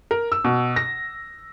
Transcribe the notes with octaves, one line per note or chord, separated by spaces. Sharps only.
A#4
E6
B2
A#6